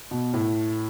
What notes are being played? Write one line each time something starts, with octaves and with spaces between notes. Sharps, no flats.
B2
A2